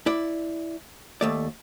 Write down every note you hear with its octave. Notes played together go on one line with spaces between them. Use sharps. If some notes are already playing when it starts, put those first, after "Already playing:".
E4 D5
D#2 A3 D5